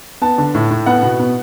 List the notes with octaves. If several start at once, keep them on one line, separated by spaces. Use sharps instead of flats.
B3 A5
D3
A2
A2
B3 F#5
B2
B3